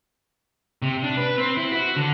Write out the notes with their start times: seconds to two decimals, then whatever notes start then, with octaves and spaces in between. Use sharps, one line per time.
0.82 C3
1.03 D4
1.17 B4
1.38 C4
1.57 E4
1.72 F#4
1.96 D3